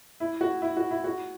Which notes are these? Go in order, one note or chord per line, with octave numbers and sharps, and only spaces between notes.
E4
F#4
E4
F#4
E4
F#4